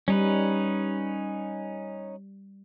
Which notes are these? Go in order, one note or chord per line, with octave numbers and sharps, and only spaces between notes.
G3 C#4 D#4 B4